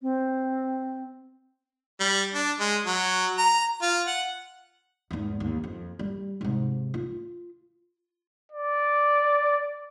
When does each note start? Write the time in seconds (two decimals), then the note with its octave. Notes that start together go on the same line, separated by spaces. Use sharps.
0.01 C4
2.00 G3
2.34 D4
2.60 G#3
2.86 F#3
3.38 A#5
3.82 F4
4.07 F#5
5.11 E2 G#2
5.40 D#2
5.64 F2
5.99 G3
6.41 G#2 C3
6.94 F4
8.52 D5